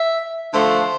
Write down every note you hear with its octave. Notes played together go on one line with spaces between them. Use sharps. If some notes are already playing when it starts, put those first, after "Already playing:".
Already playing: E5
D3 F3 A3 C5